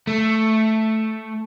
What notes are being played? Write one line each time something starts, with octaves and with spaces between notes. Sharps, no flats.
A3